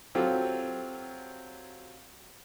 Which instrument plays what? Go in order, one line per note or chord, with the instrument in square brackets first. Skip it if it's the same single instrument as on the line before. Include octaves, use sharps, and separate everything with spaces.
[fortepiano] F#3 C4 F4 G4 A4